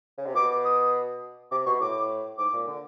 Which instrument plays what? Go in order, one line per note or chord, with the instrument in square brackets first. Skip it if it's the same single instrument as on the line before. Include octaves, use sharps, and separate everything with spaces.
[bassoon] C#3
C3
[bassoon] B2 [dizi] D6
[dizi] D#6
[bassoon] C3 [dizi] D6
[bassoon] B2 [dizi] C#6
[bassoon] A2 [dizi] D6
[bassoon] G#2 [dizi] D6
[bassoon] A#2
D3